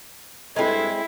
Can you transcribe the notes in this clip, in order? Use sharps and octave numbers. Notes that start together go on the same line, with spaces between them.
G2 G#3 C4 E4 A4